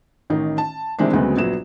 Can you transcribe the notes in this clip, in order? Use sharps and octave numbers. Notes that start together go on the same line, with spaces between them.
A1 D#3 D#4
A5
C3 D#3 E3 G#3 C4 D4
D2 C#3 F#3 G#3 B3 C4
A#1 F#3 B3 E7